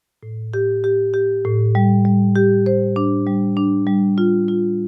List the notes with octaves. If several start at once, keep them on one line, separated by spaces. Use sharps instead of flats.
A2
G4
G4
G4
A2
G3
G3
G4
C5
D4
G3
D4
G3
F4
F4